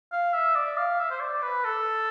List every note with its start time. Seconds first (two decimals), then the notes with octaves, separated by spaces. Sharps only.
0.12 F5
0.33 E5
0.55 D5
0.77 F5
0.99 E5
1.11 C5
1.20 D5
1.42 B4
1.64 A4